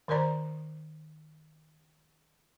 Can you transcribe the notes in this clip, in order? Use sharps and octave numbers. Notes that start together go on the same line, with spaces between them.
D#3 A#4 C5 D5 A#5